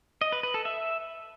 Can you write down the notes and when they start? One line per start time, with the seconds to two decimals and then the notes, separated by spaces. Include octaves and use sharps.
0.21 D#5
0.32 B4
0.43 B4
0.54 A4
0.65 E5